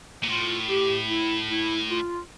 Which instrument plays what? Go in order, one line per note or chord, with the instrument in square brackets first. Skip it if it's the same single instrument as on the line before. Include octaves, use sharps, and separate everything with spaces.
[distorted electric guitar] A#2
[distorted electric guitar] A2 [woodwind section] F4
[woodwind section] G4
E4
E4
F4